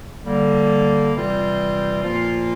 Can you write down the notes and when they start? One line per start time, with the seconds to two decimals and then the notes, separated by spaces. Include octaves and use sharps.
0.23 D3 G3 A#3
1.12 C3 E3 G3 C4 F4
2.02 A#2 F3 A#3 F4